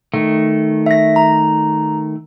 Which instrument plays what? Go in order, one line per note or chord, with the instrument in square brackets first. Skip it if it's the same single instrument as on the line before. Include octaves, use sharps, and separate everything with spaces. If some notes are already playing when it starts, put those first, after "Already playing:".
[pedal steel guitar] D#3 A3
[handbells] E5 A#6
A#5